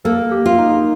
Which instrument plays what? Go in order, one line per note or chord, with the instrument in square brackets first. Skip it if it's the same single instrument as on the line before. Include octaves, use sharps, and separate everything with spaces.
[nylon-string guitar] A#3 [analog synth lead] A4
[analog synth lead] G4
[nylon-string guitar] F4
[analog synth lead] D#4